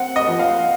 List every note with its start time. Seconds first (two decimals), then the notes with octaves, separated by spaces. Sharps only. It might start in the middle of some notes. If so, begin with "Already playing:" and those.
Already playing: C4 F#5
0.16 D#5
0.27 F3
0.39 F5